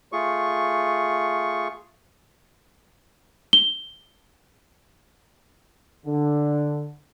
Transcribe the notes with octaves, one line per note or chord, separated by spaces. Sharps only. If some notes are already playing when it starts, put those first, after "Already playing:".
A3 F4 G#4 C#6
G7
D3